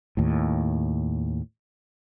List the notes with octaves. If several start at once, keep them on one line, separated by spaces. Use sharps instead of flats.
D#2 A2